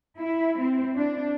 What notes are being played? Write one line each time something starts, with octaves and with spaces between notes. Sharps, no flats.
E4
C4
D4